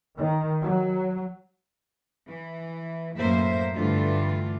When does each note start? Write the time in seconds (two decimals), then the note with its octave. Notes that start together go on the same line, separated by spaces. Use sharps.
0.18 D#3
0.63 F#3
2.28 E3
3.17 F#2 A2 A#3 C5 E5
3.75 G2 D3 E3 A3 D4 F4